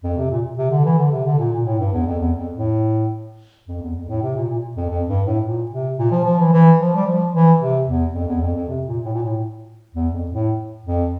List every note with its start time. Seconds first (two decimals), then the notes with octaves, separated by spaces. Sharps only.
0.03 F2
0.17 C3
0.30 A#2
0.58 C3
0.71 D3
0.85 E3
0.98 D3
1.12 C3
1.25 D3
1.38 A#2
1.52 A#2
1.66 A2
1.79 G2
1.93 E2
2.06 F2
2.19 E2
2.38 F2
2.55 A2
3.68 F2
3.82 E2
3.96 F2
4.09 A2
4.22 C3
4.36 A#2
4.49 A#2
4.77 F2
4.90 F2
5.08 G2
5.26 A2
5.44 A#2
5.71 C3
5.99 A#2
6.12 F3
6.25 F3
6.39 E3
6.52 E3
6.79 F3
6.95 G3
7.06 F3
7.33 E3
7.60 C3
7.87 E2
8.14 F2
8.28 E2
8.41 F2
8.55 F2
8.68 C3
8.87 A#2
9.05 A2
9.13 A#2
9.23 A2
9.95 E2
10.13 F2
10.31 A2
10.85 F2